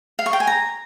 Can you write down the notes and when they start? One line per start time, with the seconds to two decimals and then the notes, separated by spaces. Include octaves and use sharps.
0.19 F5
0.26 C#6
0.33 G5
0.40 G#5
0.47 A#5